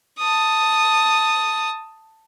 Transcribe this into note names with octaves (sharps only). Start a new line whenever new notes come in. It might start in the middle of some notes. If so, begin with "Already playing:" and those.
A5 D#6